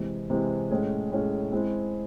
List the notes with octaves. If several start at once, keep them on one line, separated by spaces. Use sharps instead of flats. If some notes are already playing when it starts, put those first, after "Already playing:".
Already playing: C3 E3 G#3
C3 E3 G#3
A2 G#3 C#4 G#4
A2 G#3 C#4 G#4
G#3 C4 E4